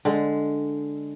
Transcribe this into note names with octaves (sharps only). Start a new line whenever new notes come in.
D3 G#3